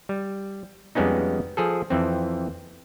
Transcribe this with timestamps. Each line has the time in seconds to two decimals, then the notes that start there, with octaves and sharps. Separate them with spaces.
0.09 G3
0.95 F2 G3 G#3 B3 C#4 D#4
1.57 F3 G#4 A4
1.90 F2 E3 C4